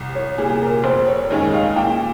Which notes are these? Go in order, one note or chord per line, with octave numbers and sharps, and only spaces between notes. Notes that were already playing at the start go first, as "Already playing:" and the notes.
Already playing: C2
C#5
A#2 G3 G#4
A#4
F1 C5
C#5
D#2 D#3 G#3 C#4 D#5
F5
A#2 G5